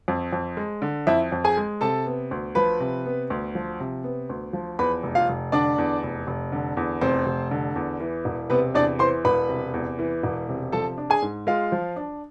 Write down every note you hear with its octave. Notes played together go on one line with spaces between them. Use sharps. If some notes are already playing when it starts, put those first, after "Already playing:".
F2
F2
G#3
D3
F2 E4 E5
F2
G#4 G#5
G#3
C3 A4 A5
B3
D2
F3 B4 B5
C3
B3
D2
F3
C3
B3
D2
F3
E2 B4 B5
F1
F4 F5
F1
D3 D4 D5
E2
F1
F1
D3
E2
F1 C4 C5
F1
D3
E2
E3
E1
C3 B3 B4
E2 D4 D5
E3 C5 C6
E1 B4 B5
C3
E2
E3
E1
C3
F3 A4 A5
D4
G#4 G#5
G#2
G#3 F4 F5
F3
D4